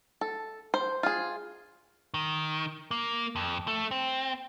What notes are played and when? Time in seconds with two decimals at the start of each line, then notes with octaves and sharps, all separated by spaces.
0.21 A4
0.74 C5
1.03 F4 G#4
2.14 D#3
2.91 A#3
3.36 F2
3.68 A3
3.91 C4